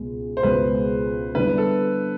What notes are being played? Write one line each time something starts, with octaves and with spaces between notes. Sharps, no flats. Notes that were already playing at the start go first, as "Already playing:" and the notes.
Already playing: C#2 B2 G#3
C5
C#2 B2 G#3 B4
D3 G3 B3 E4 B4
A4